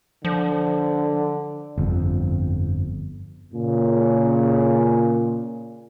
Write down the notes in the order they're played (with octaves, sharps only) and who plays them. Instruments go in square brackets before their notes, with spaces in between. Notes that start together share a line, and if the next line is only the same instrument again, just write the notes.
[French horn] D3 [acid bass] F3
[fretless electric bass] G1 F2
[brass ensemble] A#2 C#3